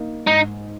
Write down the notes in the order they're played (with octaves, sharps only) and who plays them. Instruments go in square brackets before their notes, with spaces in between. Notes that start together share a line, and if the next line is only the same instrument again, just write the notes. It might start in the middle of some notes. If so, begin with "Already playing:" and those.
Already playing: [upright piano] A#3 D#4
[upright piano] G#2 [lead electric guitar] D#4